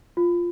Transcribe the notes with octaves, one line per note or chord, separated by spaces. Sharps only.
F4